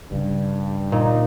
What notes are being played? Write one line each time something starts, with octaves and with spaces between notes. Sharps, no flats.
G2 C#3 C#4
A#2 D#4